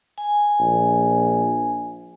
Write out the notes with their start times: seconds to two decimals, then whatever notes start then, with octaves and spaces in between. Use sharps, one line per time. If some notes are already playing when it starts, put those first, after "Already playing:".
0.18 G#5
0.60 A#1